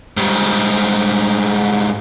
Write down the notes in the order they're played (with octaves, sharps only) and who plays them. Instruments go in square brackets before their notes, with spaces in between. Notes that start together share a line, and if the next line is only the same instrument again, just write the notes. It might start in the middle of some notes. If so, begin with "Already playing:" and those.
[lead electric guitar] G#2 G3